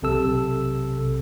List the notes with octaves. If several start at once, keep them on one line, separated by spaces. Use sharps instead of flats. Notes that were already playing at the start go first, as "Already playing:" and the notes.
B1 C3 A4 E6